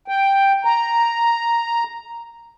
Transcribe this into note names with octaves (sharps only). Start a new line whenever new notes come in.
G5
A#5